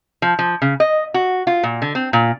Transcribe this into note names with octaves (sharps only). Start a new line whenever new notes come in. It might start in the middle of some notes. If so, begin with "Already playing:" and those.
F3
F3
C#3
D#5
F#4
F4
A#2
D3
C4
A#2